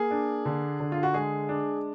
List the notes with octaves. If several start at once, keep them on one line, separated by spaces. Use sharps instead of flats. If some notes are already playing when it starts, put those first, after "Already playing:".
Already playing: A#3 G#4
D4
D3
D3
F4
F#4
G#3 G#4
D4